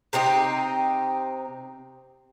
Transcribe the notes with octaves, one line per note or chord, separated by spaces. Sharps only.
C3 C4 D#4 G4